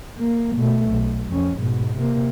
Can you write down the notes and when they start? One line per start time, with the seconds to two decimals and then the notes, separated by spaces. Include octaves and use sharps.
0.18 A#3
0.56 B2 A3
0.90 B1
1.29 F2 C#4
1.57 G#2 B2
1.97 C3 A#3